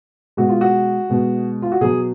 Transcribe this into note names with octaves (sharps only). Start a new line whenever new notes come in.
B2 G#3 F#4
F4
F#4
B2 G#3
F4
F#4
B2 F#3 G#4